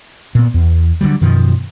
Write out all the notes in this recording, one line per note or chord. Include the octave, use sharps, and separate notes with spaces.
A#2 B3
E2
D3 E3 F#3 G3
F#2 B2 D#3 F3